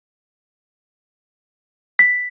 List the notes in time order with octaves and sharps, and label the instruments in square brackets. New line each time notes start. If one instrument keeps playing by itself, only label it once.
[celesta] B6